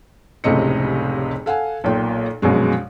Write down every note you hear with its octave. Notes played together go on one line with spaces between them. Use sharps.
F1 C#2 A2 C3 D#5 C#7
A4 F5 F#5 G#5
B1 A#2 G5
A#1 F#2 B2 G#3